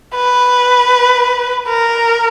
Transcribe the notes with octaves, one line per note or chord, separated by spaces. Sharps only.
B4
A#4